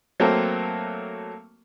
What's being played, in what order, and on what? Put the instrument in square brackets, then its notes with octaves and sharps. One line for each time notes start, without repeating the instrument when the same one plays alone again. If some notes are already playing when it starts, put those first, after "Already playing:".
[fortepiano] F#3 A3 A#3 C4